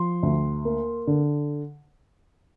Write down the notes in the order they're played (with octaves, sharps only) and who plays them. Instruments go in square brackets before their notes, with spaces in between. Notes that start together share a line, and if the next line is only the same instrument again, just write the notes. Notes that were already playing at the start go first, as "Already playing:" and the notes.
Already playing: [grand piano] F3 C6
D2
A#3
D3